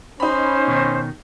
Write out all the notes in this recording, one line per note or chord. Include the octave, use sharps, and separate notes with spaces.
C#4 D#4 C5 B5
B2 D#3